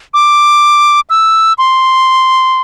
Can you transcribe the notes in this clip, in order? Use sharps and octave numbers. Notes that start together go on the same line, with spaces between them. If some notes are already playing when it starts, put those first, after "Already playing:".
D6
E6
C6